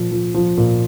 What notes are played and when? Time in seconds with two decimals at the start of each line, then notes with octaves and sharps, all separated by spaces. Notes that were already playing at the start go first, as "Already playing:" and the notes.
Already playing: A#2 F3
0.11 F3
0.34 F3
0.57 A#2